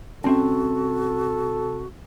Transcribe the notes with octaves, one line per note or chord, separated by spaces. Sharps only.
C2 C4 C#4 F#4 A4 E5